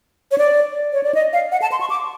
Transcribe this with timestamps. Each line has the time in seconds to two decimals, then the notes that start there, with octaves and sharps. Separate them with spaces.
0.31 C#5
0.38 D5
0.93 C#5
1.03 D5
1.15 D#5
1.33 F5
1.52 F#5
1.62 A5
1.72 C6
1.81 C#6
1.90 D6